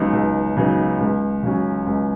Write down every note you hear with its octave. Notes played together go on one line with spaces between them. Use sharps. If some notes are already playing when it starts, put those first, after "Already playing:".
Already playing: C#2 C#3 F#3 B3 D#4
C#2
C#3 F#3 B3 D#4
C#2
C#3 F#3 C#4
C#2